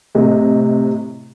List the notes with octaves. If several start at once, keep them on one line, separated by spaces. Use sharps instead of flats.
A2 C3 D#5